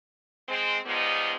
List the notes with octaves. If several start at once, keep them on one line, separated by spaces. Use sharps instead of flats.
G#3 C4
F3 G3 G#3 B3 D#4